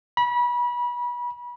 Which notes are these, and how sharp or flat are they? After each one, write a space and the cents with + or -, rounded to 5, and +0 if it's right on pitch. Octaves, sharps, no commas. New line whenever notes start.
B5 -30